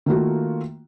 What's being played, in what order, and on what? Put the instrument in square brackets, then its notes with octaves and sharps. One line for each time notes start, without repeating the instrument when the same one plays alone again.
[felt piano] D#3 A3 A#3 F4 F#4